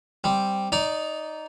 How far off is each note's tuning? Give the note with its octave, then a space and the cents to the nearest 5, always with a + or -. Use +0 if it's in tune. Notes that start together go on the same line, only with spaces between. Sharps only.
G3 +0 C4 +0
D#4 +0 D5 -20